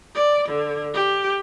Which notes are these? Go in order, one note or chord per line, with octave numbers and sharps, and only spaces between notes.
D5
D3
G4